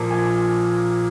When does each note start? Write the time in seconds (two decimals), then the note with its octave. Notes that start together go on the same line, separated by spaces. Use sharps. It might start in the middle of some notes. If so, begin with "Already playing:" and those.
Already playing: A#2 F3 A#3
0.11 G#5